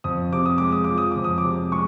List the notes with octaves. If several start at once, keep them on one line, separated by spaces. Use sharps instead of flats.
F2 D#6
C3 D6
D#6
G#3 D6
D#6
F3 D6
D#6
F2 D6
D#6
D6
C3
G#3 C#6